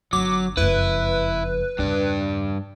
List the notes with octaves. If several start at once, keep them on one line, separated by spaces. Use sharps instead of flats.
G1 F#3 D6
F#1 F2 E4 B4
E2 G2 C#3 D4